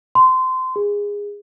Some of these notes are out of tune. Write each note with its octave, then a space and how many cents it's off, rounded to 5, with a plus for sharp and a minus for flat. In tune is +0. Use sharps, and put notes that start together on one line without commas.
C6 -20
G#4 -20